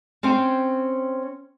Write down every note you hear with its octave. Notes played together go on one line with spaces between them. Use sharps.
C4 C#4 C5 C#5 G5